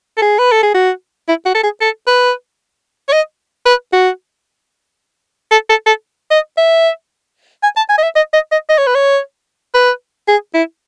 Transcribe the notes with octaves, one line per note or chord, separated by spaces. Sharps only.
A4
G#4
B4
A4
G#4
F#4
E4
F#4
A4
G#4
A4
B4
C#5
D#5
B4
F#4
A4
A4
A4
D#5
E5
G#5
A5
G#5
D#5
E5
D#5
D#5
D#5
D#5
C#5
B4
C#5
B4
G#4
E4